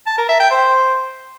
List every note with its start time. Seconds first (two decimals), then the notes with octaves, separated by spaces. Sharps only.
0.07 A5
0.18 A#4
0.29 E5
0.40 G5
0.51 C5